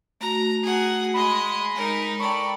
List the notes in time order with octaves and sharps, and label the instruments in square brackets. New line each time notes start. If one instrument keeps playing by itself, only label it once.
[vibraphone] A3 F#4 [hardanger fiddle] A#5
[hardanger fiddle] G#4 F#5
[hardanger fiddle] G#3 D#5 [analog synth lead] B5
[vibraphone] G#3 [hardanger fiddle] D#4 A#4
[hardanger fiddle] A4 D5 [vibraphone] G5 A#5 B5 [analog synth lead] C#6